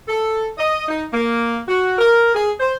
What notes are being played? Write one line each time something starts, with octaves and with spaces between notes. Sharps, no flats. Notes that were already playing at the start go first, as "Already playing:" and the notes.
A4
D#5
D#4
A#3
F#4
A#4
G#4
C5